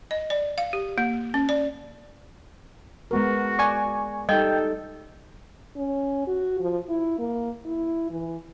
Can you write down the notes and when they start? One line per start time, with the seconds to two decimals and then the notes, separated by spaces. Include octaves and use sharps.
0.11 D#5
0.30 D5
0.58 F5
0.73 G4
0.98 A#3
1.34 C#4
1.49 D5
3.11 G#3 B3 F#4 A#4
3.59 D5 G#5 C#6
4.29 G3 D#4 A4 D#5 G5 G6
5.76 C#4
6.27 F#4
6.60 F3
6.89 E4
7.19 A#3
7.66 E4
8.11 E3